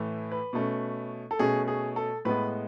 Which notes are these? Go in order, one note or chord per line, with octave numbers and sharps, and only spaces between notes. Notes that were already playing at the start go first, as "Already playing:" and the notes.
Already playing: A2 E3 A3
B4
B2 A3 C#4
A4
B2 A3 C#4 G#4
G#4
A4
A2 G#3 B3 B4